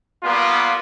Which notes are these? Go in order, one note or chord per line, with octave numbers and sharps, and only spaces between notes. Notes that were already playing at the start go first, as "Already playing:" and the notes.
G3 A#3 B3 F4